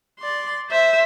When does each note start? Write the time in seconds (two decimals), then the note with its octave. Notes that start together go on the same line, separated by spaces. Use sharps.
0.20 D5 C6
0.69 C5 E5